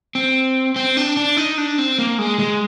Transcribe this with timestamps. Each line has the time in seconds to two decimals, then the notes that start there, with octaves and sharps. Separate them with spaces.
0.15 C4
0.76 C4
0.97 D4
1.17 D4
1.37 D#4
1.58 D4
1.78 C4
1.99 A#3
2.19 G#3
2.39 G#3